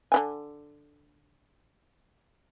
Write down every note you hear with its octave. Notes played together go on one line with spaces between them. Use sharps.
D3 E3 G#5